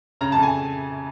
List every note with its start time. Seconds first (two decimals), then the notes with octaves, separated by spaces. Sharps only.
0.21 C#3 A#5
0.32 A5
0.37 F2
0.43 G#5